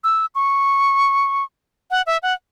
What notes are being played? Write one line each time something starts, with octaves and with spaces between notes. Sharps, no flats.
E6
C#6
F#5
E5
F#5